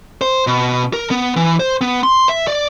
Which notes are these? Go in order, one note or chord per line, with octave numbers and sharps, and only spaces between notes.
C5
B2
A#4
B3
E3
C5
B3
C6
E5
D5